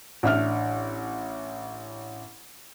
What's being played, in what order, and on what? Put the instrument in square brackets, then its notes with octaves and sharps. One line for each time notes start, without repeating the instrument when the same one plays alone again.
[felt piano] A1 D4 E5 F6